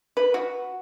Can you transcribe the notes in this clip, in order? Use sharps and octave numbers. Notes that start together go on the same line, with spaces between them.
B4
F#4